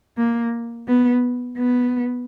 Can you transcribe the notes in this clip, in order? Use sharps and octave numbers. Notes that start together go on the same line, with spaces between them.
A#3
B3
B3